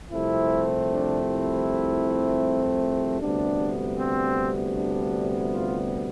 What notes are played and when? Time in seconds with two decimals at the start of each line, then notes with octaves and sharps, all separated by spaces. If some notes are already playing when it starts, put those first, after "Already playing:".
0.12 C2 C3 F3 A3 C4 E4
0.90 D4
1.28 E4
3.21 D2 C3 G3 B3 D4
3.98 C4
4.75 D4
5.52 F4